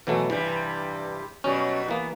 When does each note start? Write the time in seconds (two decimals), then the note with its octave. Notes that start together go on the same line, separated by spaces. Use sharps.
0.07 B2 E3 F#3 A3
0.30 G2 C3 E3 G3
1.44 B2 F#3 G3 C#4
1.88 E3 A#3 B3